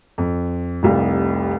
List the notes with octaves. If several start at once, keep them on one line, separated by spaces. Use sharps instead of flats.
F2
F1 C2 F5